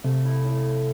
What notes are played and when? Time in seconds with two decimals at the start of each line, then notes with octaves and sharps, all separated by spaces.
0.04 C3 A3
0.25 E4
0.45 A2